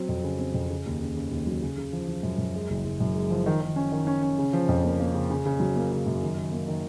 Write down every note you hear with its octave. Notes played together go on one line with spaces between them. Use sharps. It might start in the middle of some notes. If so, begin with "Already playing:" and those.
Already playing: F#3 C4
F2
C#3
C4
F2
C#3
D#2
C#3
C#3
D#2
F#3
C#3
C#3
F3
F3
F#2
F#2
G#3
F#1
F#1
F#2
G#3
F3
D#3
D#3
C#4
D#3
C#4
C#4
C#3
F3
F2
A#3
A#3
C#3
C#3
C#3
F#3
A#3
C#3
F#2
D#3
D#3
A#3
D#3